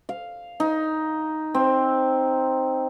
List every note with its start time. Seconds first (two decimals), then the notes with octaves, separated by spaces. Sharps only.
0.09 F5
0.60 D#4
1.54 C4